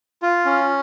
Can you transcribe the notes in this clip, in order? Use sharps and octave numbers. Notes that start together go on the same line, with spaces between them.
F4
C#4